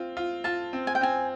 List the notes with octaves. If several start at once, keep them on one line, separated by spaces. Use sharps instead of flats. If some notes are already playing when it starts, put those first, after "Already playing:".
Already playing: C4 F4
F4
F4 A5
C4
G#5
G5
C4 G#5